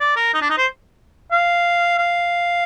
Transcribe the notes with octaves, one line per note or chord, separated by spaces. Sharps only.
D5
A#4
D#4
D4
D#4
C5
F5
F5